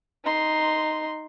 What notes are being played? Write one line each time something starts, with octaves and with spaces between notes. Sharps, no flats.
D#4 C6